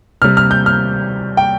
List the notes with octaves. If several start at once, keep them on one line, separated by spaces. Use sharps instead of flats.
C3 G3 F6
F6
G6
F6
G5